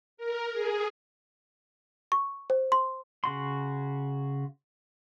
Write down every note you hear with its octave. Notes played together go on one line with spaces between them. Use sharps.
A#4
G#4
C#6
C5
C6
C#3 F#4 C6